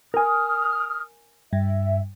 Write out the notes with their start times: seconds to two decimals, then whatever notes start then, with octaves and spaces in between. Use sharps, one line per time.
0.14 A#4 G#5 D#6 F6
1.53 G2 E5